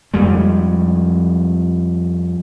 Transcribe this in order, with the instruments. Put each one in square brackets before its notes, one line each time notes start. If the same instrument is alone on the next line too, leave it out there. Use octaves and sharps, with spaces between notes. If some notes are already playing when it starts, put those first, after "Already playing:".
[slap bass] F2 G3 G#3